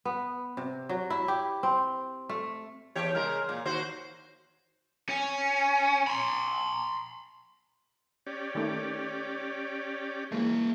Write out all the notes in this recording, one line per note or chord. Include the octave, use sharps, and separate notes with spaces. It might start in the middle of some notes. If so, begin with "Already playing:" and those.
B3
C3
F#3
E4
G4
C4
A3
E2 G4 C#5
C#3 G#3 A#4
A#2
D#2 F#4 C5
C#4
B5 C6
C#4 G4 D5
D#3 A3
E3 G#3 A#3 E5